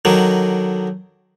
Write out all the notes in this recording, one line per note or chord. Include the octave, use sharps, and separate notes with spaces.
D3 D#3 F#3